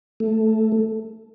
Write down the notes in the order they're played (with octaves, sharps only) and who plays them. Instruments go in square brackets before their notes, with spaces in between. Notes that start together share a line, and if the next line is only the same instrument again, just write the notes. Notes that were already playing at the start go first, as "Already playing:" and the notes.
[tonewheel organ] A3